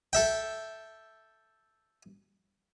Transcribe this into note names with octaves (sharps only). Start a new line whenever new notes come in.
A4 E5 G5